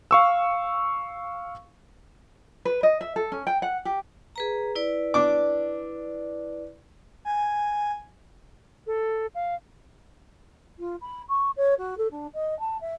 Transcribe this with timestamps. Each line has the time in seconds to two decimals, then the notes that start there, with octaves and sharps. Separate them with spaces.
0.11 F5 C#6 E6
2.65 B4
2.83 D#5
3.01 E5
3.16 A4
3.32 C#4
3.47 G5
3.62 F#5
3.85 G4
4.36 G#4 B4 A#5
4.75 E4 B4 D5
5.14 D4 D6
7.25 G#5
8.87 A4
9.35 F5
10.79 F4
11.01 B5
11.28 C#6
11.56 C#5
11.78 F#4
11.97 A4
12.11 D4
12.34 D#5
12.59 A5
12.81 E5